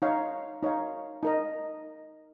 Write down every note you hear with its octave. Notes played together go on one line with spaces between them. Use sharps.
D#4 C#5 F5
D#4 C#5 F5
D#4 A#4 D#5